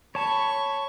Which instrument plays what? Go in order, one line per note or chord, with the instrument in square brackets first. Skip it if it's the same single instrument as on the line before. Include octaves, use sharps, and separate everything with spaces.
[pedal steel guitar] C#5 A5 [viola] B5 C#6